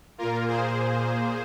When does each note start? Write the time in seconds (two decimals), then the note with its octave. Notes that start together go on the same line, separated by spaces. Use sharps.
0.18 A#2 A#3 F4 A#4
0.48 G#4 C5